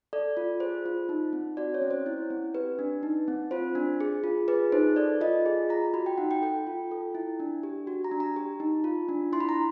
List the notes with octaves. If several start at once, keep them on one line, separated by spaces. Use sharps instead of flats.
A4 D5
F4
G#4 C5
F4
D#4
C4
F#4 D5
C#5
C#4
C5
E4
C4
G4 B4
D4
D#4
C4
F4 C5
D4
G#4
F4
G#4 B4
D#4 C5
A4 D5
F4 D#5
G#4
F4 A#5
F#4 B5
G5
D#4 F#5
G5
A4 G5
F4
A4
E4
D4
G4
F#4
A#5
D4
A#5
G4
D#4
F4
D4
E4 C6
B5
A#5